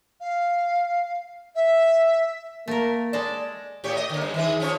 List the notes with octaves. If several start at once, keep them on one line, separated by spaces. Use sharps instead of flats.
F5
E5
A3 A#3 A#4
G#3 A4 D5 A5
A2 G4 C#5
D#5
D3 A#3
G2
D#3 E3 G#4
F3 C#4 C#5